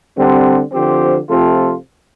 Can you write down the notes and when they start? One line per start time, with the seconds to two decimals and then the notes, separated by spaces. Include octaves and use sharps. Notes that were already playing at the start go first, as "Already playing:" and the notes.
0.15 D3 G3 C4
0.72 D3 F3 C4 G4 C5
1.29 C3 F3 A3 F4 A4